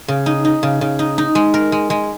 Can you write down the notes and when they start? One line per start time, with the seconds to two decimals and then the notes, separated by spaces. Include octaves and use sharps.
0.08 C#3
0.26 D#4
0.45 D#4
0.63 C#3
0.81 C#3
0.99 D#4
1.18 D#4
1.35 G#3
1.54 A#4
1.72 G#3
1.90 G#3